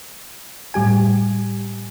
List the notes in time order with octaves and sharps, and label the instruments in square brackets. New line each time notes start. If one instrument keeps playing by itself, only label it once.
[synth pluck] A2 G3 G4 G#5